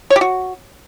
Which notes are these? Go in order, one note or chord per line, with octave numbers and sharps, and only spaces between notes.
C#5
G4
F#4